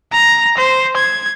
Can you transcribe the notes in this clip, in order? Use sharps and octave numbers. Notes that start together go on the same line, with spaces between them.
A#5
C5
G#6